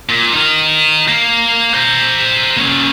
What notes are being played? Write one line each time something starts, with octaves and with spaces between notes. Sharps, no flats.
A#2
D#4 A#4
A#3
C5 A#5
A#3 C#4